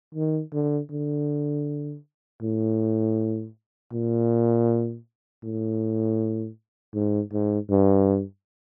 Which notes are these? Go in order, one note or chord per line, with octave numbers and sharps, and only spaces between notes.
D#3
D3
D3
A2
A#2
A2
G#2
G#2
G2